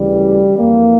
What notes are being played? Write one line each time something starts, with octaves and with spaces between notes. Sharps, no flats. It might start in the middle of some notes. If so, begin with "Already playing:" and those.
Already playing: D2 C#3 E3 G3
F2 E3 A#3